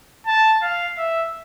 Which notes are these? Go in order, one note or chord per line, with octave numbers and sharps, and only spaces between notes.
A5
F5
E5